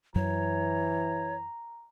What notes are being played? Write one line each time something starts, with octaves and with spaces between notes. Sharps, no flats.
F#2 E3 F#3 C#5 A#5